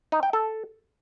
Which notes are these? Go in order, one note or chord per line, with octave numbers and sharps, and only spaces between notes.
D#4
G5
A4